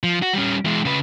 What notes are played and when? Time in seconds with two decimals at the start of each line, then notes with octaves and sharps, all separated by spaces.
0.03 F3
0.22 F#4
0.34 G3 C#4
0.65 E3 G#3
0.85 C#3 B4